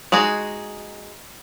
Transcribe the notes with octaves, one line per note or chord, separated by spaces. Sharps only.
G#3 D#4 F#4 G#4